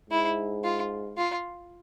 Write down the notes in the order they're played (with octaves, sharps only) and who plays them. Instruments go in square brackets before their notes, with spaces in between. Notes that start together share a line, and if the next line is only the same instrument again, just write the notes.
[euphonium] G#2 [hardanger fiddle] E4
[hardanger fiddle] F4
F4